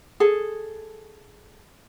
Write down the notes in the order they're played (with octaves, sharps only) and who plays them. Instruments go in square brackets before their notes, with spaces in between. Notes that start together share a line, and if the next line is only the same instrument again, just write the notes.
[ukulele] G#4 A4